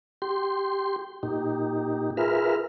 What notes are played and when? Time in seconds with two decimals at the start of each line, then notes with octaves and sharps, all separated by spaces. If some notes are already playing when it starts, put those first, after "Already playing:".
0.22 G4 C6
1.23 A#2 D#4 G4
2.17 F4 G#4 A#4 B4 E5 F6